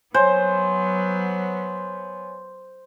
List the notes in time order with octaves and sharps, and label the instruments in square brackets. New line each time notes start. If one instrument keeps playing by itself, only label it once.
[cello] F#3 B3 [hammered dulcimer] C5 [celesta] C#5 G#5